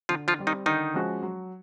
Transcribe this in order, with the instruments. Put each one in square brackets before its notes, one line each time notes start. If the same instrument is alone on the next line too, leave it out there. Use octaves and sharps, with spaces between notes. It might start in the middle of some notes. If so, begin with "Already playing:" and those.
[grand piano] D3 [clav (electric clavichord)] F3 F4
[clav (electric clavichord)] F3 F4
[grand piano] G3 C4
[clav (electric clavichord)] D#3 D#4
[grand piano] D3 [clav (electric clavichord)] D#3 D#4
[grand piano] F3 G#3 C#4 F#4
F#3